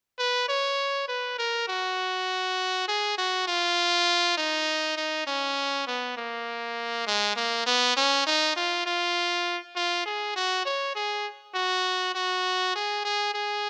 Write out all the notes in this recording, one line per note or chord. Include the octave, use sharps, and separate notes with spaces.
B4
C#5
B4
A#4
F#4
G#4
F#4
F4
D#4
D#4
C#4
B3
A#3
G#3
A#3
B3
C#4
D#4
F4
F4
F4
G#4
F#4
C#5
G#4
F#4
F#4
G#4
G#4
G#4